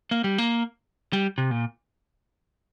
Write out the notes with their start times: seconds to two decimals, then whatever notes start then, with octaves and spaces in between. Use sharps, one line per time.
0.11 A#3
0.24 G3
0.38 A#3
1.13 G3
1.38 C3
1.51 A#2